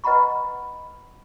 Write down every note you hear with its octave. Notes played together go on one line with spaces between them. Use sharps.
B4 D#5 F#5 A#5 B5 C#6